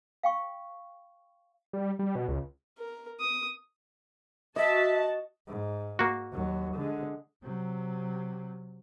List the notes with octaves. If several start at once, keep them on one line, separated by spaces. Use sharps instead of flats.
F5 G5 C#6
G3
G3
B2
C#2
A#4
D#6
F#4 D#5 E5 A5
G#2
A#3 F#4
D#2 F#3
D3 G#3
C3 F#3